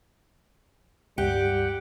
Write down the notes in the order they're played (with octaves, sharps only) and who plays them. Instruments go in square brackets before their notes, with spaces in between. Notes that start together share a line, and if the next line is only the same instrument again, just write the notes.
[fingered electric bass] C#2 G2 [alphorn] G3 [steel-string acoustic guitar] G4 [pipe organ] F#5 G5